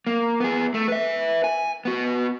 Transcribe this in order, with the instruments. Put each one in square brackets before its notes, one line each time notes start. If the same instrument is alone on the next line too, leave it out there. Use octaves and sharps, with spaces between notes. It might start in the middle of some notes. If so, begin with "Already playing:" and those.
[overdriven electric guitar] A#3
B3 G#4
A3
B4 E5
G#5
B3 F#4